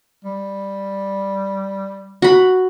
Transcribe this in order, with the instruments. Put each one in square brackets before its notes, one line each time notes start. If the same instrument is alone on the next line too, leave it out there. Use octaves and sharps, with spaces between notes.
[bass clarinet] G3
[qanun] F#4 B5